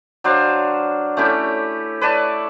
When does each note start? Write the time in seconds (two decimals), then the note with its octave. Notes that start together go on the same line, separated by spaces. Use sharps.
0.24 F#3 D4 C5 F5
1.17 A3 C#4 E4 G4
2.01 B4 C#5 D5 A5